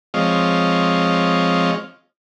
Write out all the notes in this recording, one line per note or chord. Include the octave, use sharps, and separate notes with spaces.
F3 G#3 C4 C#5 D#5 F5